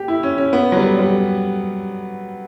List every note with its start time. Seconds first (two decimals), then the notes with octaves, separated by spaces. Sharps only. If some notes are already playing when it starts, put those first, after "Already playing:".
Already playing: G4
0.08 E4
0.23 C#4
0.38 C#4
0.53 B3
0.72 F#3
0.77 G3
0.99 G3